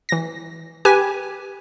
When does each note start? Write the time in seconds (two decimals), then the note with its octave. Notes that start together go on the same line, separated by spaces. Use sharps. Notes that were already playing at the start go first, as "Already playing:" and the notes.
0.09 E3 A#6
0.85 G4 B4 G#5